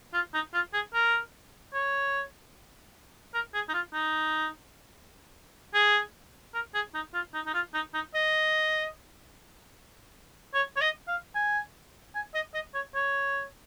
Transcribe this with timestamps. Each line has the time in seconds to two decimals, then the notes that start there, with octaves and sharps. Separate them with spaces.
0.13 F4
0.34 D#4
0.54 F4
0.73 G#4
0.93 A#4
1.73 C#5
3.34 A#4
3.54 G#4
3.69 D#4
3.74 F4
3.93 D#4
5.74 G#4
6.54 A#4
6.74 G#4
6.94 D#4
7.14 F4
7.34 D#4
7.46 D#4
7.54 F4
7.74 D#4
7.94 D#4
8.14 D#5
10.54 C#5
10.76 C#5
10.81 D#5
11.08 F5
11.35 G#5
12.15 G#5
12.34 D#5
12.54 D#5
12.74 C#5
12.95 C#5